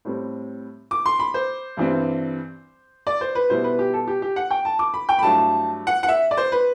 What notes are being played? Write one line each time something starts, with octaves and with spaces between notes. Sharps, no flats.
A2 G3 C4
D6
C6
B5
C5
G2 E3 G3 C4
D5
C5
B4
B2 G3 B3 E4 C5
B4
G4
A4
G4
G4
F#5
G5
A5
D6
B5
G5
B5
G2 F#3 A3 E4 A5
F#5
F#5
E5
D5
C5
B4